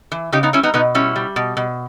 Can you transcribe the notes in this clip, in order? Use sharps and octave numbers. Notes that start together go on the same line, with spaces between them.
E3
C#3 D#4 G4
B3 D#4
G3 C#4 E4
B3 D#4
B2 B3 D#4
G3 C#4 E4
G3
B2
B2